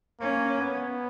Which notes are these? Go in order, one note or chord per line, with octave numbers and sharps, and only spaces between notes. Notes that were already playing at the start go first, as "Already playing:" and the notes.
A#3 C#4
B3